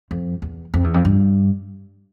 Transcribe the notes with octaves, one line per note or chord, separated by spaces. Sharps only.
F2
E2
F2
E2
F2
G2